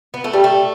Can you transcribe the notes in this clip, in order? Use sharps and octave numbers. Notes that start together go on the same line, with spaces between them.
B3
A3
G3
A3